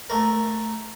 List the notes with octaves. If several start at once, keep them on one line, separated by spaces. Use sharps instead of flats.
A3 A#4